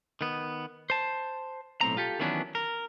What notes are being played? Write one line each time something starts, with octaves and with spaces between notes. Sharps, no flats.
D#3 B3
C5 A5
B1 A2 C4 A#5
F4 G4 A4
D#3 E3 F#3 B3 C#4 D4
A#4